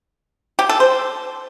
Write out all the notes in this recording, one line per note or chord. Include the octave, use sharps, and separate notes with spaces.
G4
A4
C5